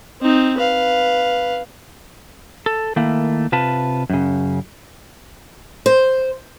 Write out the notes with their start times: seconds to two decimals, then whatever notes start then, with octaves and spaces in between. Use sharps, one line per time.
0.21 C4 D#4
0.58 B4 F5
2.66 A4
2.96 D#3 A3 A#3 E4
3.52 C3 F4 B4 A5
4.10 F#2 C#3
5.86 C5